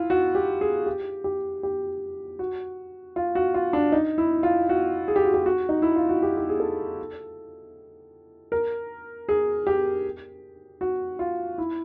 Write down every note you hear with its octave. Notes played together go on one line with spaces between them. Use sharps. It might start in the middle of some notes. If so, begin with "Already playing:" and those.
Already playing: E4 F4
F#4
G4
G#4
G4
G4
G4
F#4
F4
F#4
F4
D4
D#4
E4
F4
F#4
G#4
G4
F#4
G4
F#4
D#4
E4
F4
F#4
G4
G4
G#4
A4
A#4
G#4
G4
F#4
F4
E4